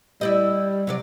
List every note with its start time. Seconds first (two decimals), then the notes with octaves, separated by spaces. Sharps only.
0.21 G3 E4 D5 D#5
0.87 C3 F#3 D5